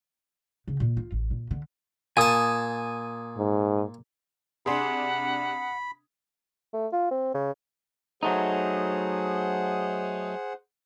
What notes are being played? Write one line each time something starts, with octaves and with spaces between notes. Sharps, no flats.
C#3
A#2
F4
A1
A#2
D3
A#2 G#5 A5 D#6
G#2
C3 D4 G#4 F#5 B5 C6
A3
F4
C4
C#3
F#3 A3 D#4 G#4 C5 F#5